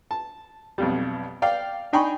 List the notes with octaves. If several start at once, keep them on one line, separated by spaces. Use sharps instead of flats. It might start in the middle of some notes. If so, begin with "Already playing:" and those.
A5
B1 F2 G3
D5 F5 G5
D4 D#4 G5 G#5 B5 C#6